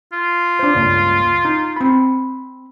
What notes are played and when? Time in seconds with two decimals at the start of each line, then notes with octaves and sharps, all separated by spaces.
0.12 F4
0.59 D4 C5
0.75 C#2 G2 A#3
1.45 D#4
1.76 C4 B5